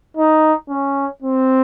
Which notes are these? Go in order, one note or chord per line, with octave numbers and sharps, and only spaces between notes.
D#4
C#4
C4